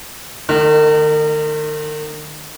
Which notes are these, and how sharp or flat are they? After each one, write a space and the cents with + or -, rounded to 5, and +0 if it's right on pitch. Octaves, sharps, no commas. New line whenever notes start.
D#3 -40 A3 +0 D#4 -10